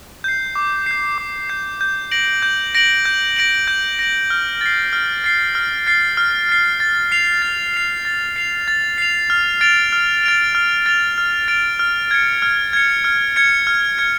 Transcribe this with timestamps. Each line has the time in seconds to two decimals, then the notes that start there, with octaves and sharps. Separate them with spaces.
0.24 G6 C7
0.56 D6
0.86 G6 C7
1.18 D6
1.49 G6 C7
1.81 G6
2.11 A#6 D7 F#7
2.42 G6
2.75 A#6 D7 F#7
3.06 G6
3.36 A#6 D7 F#7
3.68 G6
3.99 A#6 D7 F#7
4.30 F6
4.61 A6 C7
4.93 F6
5.24 A6 C7
5.55 F6
5.87 A6 C7
6.17 F6
6.49 A6 C7
6.80 A6
7.12 C7 F7
7.42 A6
7.74 C7 F7
8.05 A6
8.36 C7 F7
8.68 A6
8.98 C7 F7
9.30 F6
9.61 A6 D7 F7
9.93 F6
10.23 A6 D7 F7
10.55 F6
10.86 A6 D7 F7
11.18 F6
11.48 A6 D7 F7
11.79 F6
12.11 G#6 C#7
12.42 F6
12.73 G#6 C#7
13.04 F6
13.36 G#6 C#7
13.67 F6
13.98 G#6 C#7